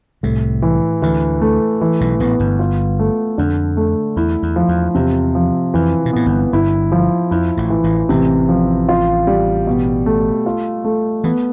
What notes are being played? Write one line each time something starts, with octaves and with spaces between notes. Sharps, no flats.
C2 A2 C3
E3
D2 D3 E3
A3
E3
B1 B2
A1 A2 B3
G1 G2
F4
A3
F2 D3
A3
E2 E4
E2
F3
E2
E2 C3
F3
F2 E3
B2
A2 B3
G1 G2
G1 G2 E4
F3
F2 E4
A1 A2
E3
A1 A2
A1 A2 C3
F3
F4
G3
B2
A3
F4
A3
E3 B3